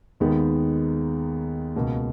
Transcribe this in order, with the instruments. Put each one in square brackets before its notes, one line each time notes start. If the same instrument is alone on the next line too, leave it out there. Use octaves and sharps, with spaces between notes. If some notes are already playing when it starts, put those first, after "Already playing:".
[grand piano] D#2 D#3 G#3 B3 D#4
C#2 B2 A#3